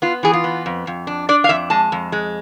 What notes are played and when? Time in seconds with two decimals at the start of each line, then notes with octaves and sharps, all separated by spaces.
0.02 B3 F4
0.23 E3 G#4
0.33 F4
0.44 B3
0.66 F2
0.87 F2
1.07 D4
1.29 D4 D5
1.44 F5
1.49 F2 E5
1.70 G#3 A5
1.92 F2
2.12 G#3